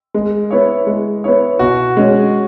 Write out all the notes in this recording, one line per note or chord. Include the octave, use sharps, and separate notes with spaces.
G#3
B3 E4 C#5
G#3
B3 E4 C#5
B2 F#4
G#3 C#4